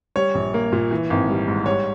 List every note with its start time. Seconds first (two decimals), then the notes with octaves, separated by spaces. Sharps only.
0.16 G3 C#5
0.35 A#1
0.54 A#3
0.73 A#2
0.91 E3
1.10 G#1
1.29 G3
1.48 G#2
1.66 G3 C#5